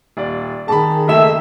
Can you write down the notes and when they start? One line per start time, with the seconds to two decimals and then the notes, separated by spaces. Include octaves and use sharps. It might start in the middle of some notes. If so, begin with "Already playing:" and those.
0.17 D#1 D5
0.68 D#3 G#4 A5 B5
1.08 F#1 A3 D#5 E5 E7